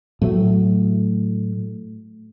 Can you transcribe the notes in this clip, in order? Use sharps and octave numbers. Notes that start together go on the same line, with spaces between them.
A2 F#3 A3